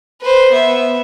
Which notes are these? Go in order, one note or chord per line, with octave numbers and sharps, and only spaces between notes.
B4 C5
B3 E5